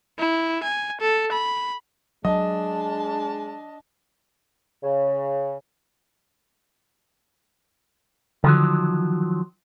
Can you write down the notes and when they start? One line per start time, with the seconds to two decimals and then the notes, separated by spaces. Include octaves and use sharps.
0.19 E4
0.63 G#5
1.01 A4
1.32 B5
2.25 F#3 G#3 D4 D#5 A5
4.83 C#3
8.44 D3 D#3 F3 F#3